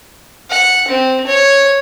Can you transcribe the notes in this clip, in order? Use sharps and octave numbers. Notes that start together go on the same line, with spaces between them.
F#5
C4
C#5